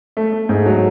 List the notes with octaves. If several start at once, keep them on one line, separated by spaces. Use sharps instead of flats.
A3
A3
G#2
F#3